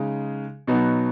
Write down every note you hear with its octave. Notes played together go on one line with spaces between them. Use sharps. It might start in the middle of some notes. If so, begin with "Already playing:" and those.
Already playing: C#3 G#3 D#4
B2 F#3 B3 D#4 F#4